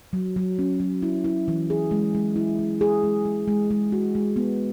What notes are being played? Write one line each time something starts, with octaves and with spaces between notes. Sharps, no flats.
F#3
F#3
C#4
F#3
E4
E4
E3
G#4
G#3
G#3
E4
G#3
G#4
G#3
G#3
G#3
G#3
F#4
G#3
B3